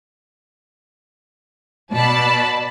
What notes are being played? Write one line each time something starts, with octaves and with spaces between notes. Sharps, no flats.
B2 D5 A5 B5